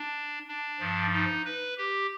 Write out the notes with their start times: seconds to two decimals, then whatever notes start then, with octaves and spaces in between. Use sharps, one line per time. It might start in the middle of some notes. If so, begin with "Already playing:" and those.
Already playing: D4
0.48 D4
0.80 G2 F3
1.13 D#4
1.45 B4
1.77 G4